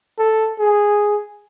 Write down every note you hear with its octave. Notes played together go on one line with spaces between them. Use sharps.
A4
G#4